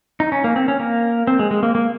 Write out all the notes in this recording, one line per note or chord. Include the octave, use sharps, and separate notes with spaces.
D#4
C#4
A#3
C4
C#4
A#3
C4
G#3
G#3
A#3
A#3